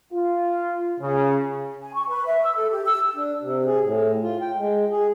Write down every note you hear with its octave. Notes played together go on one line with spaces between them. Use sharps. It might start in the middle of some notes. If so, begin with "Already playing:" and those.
F4
C#3
G#5
C#6
B4
E5
E6
A4
G4
E6
D4
C3
G#4
A2
F4
G5
G#3
G#4